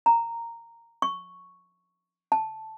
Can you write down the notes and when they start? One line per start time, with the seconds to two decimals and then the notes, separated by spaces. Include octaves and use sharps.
0.06 A#5
1.02 C#6
2.32 A5